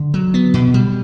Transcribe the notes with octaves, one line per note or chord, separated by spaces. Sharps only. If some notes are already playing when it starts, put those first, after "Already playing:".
Already playing: D3
F#3
B3
B2
G3